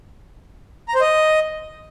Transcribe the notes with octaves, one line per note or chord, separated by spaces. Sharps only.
A#5
C5
D#5